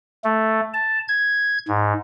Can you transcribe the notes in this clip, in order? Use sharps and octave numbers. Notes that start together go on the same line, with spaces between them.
A3
A5
G#6
G#2